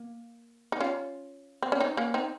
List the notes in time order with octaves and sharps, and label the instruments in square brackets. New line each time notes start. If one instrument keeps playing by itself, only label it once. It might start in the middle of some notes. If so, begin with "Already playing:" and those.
Already playing: [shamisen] A#3
D#4
C#4 F4
C4
C#4
C4 D#4
A#3 C#4
C4 D#4